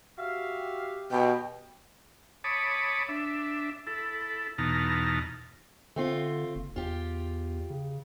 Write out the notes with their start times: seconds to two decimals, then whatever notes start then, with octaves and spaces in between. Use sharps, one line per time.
0.18 F#4 G4 E5 F5
1.11 B2 G5
2.44 C#5 A5 B5 D6 D#6
3.09 D4 E5
3.87 E4 A4
4.58 E2 B2 D#4 A5 A#5 F6
5.96 D3 A3 C4 F4
6.56 F#1
6.76 E2 F4 G4
7.70 C#3